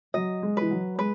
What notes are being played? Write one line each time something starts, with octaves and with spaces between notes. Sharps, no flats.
F#3 D#5
G#3
E3 B4
F#3
G#3 B4